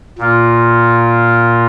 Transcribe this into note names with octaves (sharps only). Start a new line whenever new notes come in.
A#2 A#3 F4